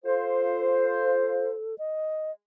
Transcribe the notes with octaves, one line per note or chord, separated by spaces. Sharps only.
F4 A4 C5
D#5